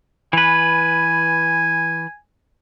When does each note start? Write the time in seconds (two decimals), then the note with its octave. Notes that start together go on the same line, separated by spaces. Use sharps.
0.33 E3 B4 G#5